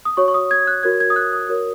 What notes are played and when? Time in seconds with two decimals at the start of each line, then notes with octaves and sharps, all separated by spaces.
0.05 D#6
0.17 F#4 C#5 C#6
0.28 C#6
0.34 D#6
0.51 G#6
0.67 F#6
0.83 F#4 A#4 C#5 G#6
1.00 G#6
1.10 D#6
1.16 F#6
1.33 D#6
1.49 F#4 A#4 C#5